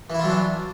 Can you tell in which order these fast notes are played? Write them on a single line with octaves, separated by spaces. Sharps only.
E3 E4 F4 F#3 D4